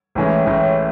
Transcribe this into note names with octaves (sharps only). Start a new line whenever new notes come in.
A1 A2 E3 G#3 C#4
A1 A2 E3 G#3 C#4